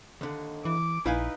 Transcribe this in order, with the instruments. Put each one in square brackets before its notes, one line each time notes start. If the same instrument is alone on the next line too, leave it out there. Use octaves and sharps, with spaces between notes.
[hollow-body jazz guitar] D#2 D3
[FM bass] E3 [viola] D6
[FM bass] A#1 [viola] D#4 B4 [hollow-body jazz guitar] E4 F5 G#5